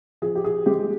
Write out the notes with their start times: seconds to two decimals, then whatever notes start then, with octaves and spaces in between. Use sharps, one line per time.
0.22 F3 G#4
0.35 G4
0.44 G#4
0.66 G#3 G4